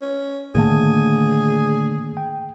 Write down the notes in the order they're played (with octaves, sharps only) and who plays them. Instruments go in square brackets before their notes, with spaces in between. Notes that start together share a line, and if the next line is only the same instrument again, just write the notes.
[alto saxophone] C#4
[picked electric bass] A2 D3 A3 [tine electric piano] D#3 A#3 [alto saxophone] G#4
[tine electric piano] G5